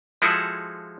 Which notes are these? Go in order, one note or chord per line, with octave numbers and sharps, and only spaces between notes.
F3 G#3 E4 F#4 G#4 A4